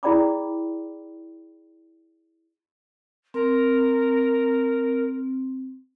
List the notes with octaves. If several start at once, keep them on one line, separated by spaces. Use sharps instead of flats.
E4 G#4 D5 G5 B5 D6
C4 A#4